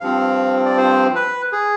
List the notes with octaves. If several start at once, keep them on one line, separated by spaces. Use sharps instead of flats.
G2 F3 C4 F5
D5
C5
B4
G#4